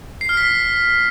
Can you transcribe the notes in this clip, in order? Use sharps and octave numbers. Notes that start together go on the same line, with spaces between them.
C7
F6
B6